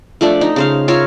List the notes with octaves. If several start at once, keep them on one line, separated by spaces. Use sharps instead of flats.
F3 A3 D4
D#4
C#3 C5 F5
F4 A#4 C#5 E5